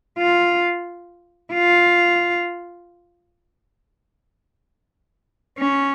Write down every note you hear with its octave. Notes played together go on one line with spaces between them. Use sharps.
F4
F4
C#4